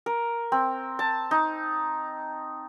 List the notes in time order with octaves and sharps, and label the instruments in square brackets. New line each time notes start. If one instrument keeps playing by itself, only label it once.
[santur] A#4
C4
A5
D#4